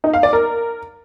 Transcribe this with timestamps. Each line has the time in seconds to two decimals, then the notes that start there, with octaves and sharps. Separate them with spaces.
0.04 D#4
0.13 F5
0.23 D5
0.33 A#4